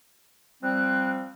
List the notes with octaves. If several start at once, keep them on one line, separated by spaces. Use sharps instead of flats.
F3 G3 C4 F#6